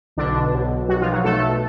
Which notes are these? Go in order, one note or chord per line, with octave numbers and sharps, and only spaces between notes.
B1 B2 D3 D4
B1 B2
B1 B2 F#3 F#4
F3 F4
F#3 F#4
B1 B2 A3 A4